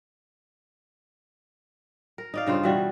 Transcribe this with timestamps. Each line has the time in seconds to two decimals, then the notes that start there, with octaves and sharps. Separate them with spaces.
2.18 A#4
2.34 D#4 D5 F5
2.47 G2 C#3 F4 C5
2.63 B2 E3 G3 F#4